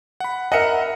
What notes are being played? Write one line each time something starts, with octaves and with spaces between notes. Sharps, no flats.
F#5 B5
A#4 D#5 E5 F#5 C#7